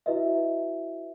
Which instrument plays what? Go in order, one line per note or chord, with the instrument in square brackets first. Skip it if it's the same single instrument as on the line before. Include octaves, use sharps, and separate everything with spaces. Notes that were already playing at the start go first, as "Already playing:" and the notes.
[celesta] E4 F#4 B4 D#5 E5